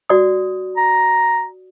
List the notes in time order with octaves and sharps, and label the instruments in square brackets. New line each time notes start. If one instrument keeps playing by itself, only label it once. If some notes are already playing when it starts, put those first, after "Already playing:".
[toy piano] F#4 D5 D#6
[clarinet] A#5